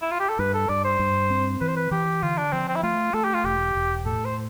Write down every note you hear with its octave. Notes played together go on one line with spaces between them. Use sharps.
E4
F4
G4
A4
G2 B4
A4
G2 D5
C5
G2
C4
E3 B4
C5
B4
E3 G4
D3 F4
D4
F3 C4
C4
E4
A3 F4
A3 A4
G4
F4
E1 G4
E1
A2 A4
C5